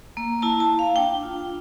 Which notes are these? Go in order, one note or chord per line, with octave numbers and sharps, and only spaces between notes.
A#3
E4 A5
A5
A#3
F5
D4 G5
F4